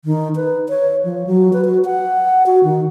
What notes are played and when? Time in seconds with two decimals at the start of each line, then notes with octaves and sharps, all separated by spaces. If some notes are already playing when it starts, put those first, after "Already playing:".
0.05 D#3
0.36 B4
0.69 C#5
1.04 F3
1.27 F#3
1.53 B4
1.65 F#4
1.85 F#5
2.46 F#4
2.64 D#3